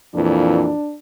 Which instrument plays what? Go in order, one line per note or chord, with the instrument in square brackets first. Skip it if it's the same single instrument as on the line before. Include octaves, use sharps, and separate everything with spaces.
[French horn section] F2 A#2 E3 [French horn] D4